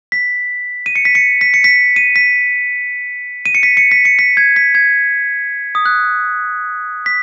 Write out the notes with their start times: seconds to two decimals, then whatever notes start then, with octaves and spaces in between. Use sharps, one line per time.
0.12 B6
0.86 D#7
0.96 C#7
1.05 B6
1.15 C#7
1.41 B6
1.54 C#7
1.64 B6
1.96 D#7
2.16 B6
3.46 D#7
3.55 C#7
3.63 B6
3.77 C#7
3.91 B6
4.05 C#7
4.19 B6
4.37 G#6
4.56 B6
4.75 G#6
5.75 D#6
5.86 F#6
7.06 B6